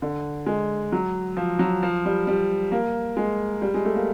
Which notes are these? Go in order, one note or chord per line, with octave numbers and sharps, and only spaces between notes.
D3
G#3
F#3
F3
F#3
F3
G3
G3
A#3
G#3
G3
G#3
A3
A#3